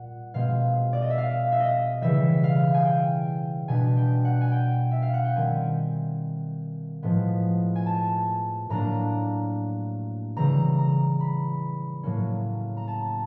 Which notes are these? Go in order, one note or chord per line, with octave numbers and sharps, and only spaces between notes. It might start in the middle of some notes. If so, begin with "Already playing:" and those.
Already playing: A#2 G3 F#5
B2 G#3 C4 F5
D5
D#5
E5
F5
E5
D#5
C#3 E3 G3 E5
F5
G#5
G5
B2 G3 B3 D4 G#5
G5
F#5
G#5
G5
E5
F5
F#5
G5
D#3 G3 C4 G#5
A2 F3 G#3 B3
G#5
A5
A2 F#3 A#3 D4 A#5
C#3 E3 G3 A#5
A#5
B5
A2 F#3 A#3 C#4
A#5
A5